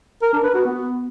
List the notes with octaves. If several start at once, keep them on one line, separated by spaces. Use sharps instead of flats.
A#4
D4
B4
F#4
B3